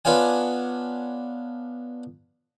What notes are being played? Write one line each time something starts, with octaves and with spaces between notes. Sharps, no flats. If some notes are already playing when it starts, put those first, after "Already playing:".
B3 D4 F4 C#5 G#5